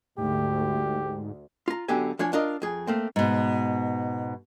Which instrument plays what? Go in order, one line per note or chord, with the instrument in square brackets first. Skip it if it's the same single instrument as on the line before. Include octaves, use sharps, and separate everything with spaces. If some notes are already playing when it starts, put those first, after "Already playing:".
[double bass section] D2 [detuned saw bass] G#2 [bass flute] A3 [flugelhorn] G4
[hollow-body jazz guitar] F4 A#5
F#2 D3 F#3 B3 G4 G#5
F3 D4 C#5 G#5
D4 F4 A#4 D#5
F2 G#4
A3 A#3 C4
[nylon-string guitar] G#2 B2